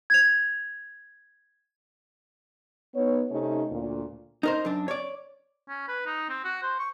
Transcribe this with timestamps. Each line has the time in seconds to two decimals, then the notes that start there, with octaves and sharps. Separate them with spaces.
0.10 G#6 F7
2.94 B3 D#4 C#5
3.30 C3 A3 C#4 D#4
3.70 D2 A#2
4.43 D#4 A#4 C5
4.65 F#2 D4
4.88 C#5 D5
5.69 C#4
5.88 B4
6.06 D#4
6.29 C4
6.45 F#4
6.63 C5
6.79 C#6